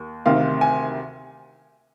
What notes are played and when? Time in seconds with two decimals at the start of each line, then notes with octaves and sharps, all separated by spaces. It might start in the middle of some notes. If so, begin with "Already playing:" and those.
Already playing: D#2
0.26 D2 C3 D#3 F5
0.61 G#5